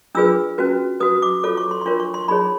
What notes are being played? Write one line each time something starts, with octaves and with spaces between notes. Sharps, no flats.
D4 F4 G#4 B4 E6
C#4 F#4 B4
F#4 B4 D#6
D6
F4 A4 C#5 D6
C#6
C6
C6
D4 F4 A#4 C#5 C#6
C#6
C6
D#4 G#4 C#5 B5